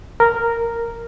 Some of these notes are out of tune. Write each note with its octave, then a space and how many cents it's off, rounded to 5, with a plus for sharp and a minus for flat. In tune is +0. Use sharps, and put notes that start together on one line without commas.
A#4 -5